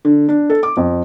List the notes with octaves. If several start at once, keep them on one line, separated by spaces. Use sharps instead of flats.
D3
D4
A4
D6
F2